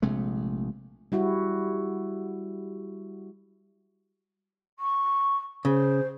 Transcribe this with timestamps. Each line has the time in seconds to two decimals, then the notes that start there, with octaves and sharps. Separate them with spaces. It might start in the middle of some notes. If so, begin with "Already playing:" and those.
0.02 A#1 C3 G#3 A3
1.12 G3 E4 F#4
4.79 C#6
5.65 C#3 C5